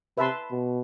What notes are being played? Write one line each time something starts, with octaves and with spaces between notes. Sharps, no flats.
C3 B4 E5 A5 C6
B2